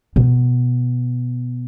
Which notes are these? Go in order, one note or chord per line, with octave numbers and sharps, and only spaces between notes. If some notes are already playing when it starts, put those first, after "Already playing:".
B2